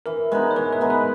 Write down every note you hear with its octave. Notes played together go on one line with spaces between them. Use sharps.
E3 A#4
G#3 B3 D#4
C#5
E3 B4
B4
G#3 B3 D#4
B4